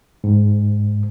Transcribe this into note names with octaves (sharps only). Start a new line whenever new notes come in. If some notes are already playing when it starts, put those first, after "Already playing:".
G#2